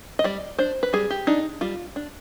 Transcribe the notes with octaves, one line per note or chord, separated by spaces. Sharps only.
D#5
G3 D5
D4 C5
B4
G3 G#4
G4
D4 D#4
G3 F4
D4